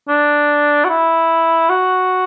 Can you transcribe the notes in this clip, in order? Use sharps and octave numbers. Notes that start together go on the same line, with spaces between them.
D4
F#4
E4
F#4